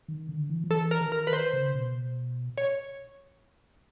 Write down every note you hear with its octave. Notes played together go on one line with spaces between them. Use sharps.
D#3
D3
E3
F3
E3 A4
A#4
D#3
A#4
B4
C5
C#3
B2
C#5